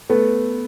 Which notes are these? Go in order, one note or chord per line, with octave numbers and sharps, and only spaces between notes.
A3 B3